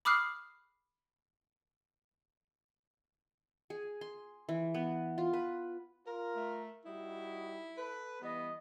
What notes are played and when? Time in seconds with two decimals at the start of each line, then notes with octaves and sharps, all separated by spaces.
0.05 B5 D6 D#6 F6 F#6 C7
3.70 G#4
4.01 C6
4.49 E3
4.74 B3
5.18 F4
5.33 B4
6.06 F4 A#4
6.36 A3
6.85 G3 D#4 E4 F#4
7.77 A4 B4
8.22 E3 G3 B3 D#5